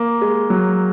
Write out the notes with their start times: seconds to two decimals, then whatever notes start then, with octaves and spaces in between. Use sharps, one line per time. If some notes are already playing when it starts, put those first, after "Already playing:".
Already playing: A#3
0.22 G#3
0.50 F#3